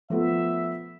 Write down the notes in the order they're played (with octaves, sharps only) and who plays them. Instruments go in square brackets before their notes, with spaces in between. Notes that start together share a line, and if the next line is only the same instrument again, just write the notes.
[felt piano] F3 A3 B3 [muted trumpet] E5